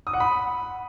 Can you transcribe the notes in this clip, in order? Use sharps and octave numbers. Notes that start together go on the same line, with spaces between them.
D#6
F#5
B5